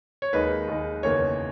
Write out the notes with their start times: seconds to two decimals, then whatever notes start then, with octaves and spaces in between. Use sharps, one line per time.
0.22 C#5
0.33 D#2 D#3 G#3 D#4 B4
0.68 D#2 D#3 G#3 D#4
1.03 F#1 E2 D#3 A#3 C#5